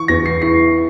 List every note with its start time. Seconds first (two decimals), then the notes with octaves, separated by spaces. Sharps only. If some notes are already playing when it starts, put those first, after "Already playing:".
Already playing: E3 C#6
0.08 E2 A#6
0.26 C7
0.42 E4 C7